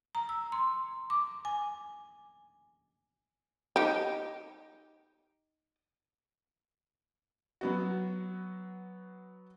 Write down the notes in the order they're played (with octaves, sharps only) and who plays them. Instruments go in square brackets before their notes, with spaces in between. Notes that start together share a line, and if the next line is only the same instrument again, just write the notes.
[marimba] A#5
E6
C6
D6
G#5
[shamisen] D#4 G4
[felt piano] F#3 B3 F#4